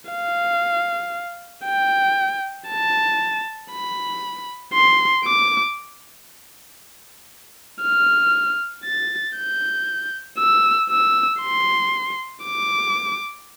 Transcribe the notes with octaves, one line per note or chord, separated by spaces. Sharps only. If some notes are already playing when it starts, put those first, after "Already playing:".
F5
G5
A5
B5
C6
D6
F6
A6
G6
E6
E6
C6
D6